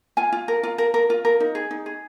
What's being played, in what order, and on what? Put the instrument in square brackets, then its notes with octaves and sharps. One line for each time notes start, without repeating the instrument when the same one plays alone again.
[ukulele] F4 G#5
F4
A#4
F4
A#4
A#4
F4
A#4
D#4
G#4
D#4
G#4